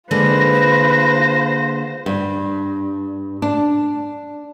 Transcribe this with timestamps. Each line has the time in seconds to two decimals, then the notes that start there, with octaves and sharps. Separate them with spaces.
0.11 D3 G#3 A#3 F4 B4 C5 A#6
2.06 G2
3.42 D4